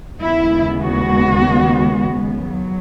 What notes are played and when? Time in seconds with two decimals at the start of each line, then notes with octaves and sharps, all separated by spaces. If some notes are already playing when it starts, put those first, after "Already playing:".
0.21 D#2 C#3 G#3 B3 E4
0.79 F#4
2.50 F#3